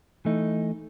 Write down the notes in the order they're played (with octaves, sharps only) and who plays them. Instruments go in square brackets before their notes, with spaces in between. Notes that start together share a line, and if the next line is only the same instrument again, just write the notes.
[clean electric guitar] E3 A3 D#4